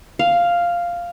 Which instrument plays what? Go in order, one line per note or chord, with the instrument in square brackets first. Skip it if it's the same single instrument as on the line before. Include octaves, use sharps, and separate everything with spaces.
[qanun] F5